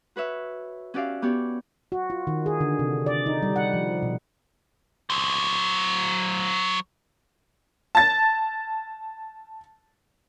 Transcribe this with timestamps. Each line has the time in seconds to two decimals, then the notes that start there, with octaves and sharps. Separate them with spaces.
0.16 F#4 B4 C#5 E5
0.94 C#4 F#4 G4 D5 E5 F5
1.22 B3 G4 C#5 D5
1.92 F#4
2.10 F4
2.27 D#3
2.46 G#4
2.61 D3
2.79 C3
3.06 D5
3.26 D#4
3.42 G3
3.56 F#5
3.74 F3
4.02 B2
5.10 F#3 C5
7.95 A5 A6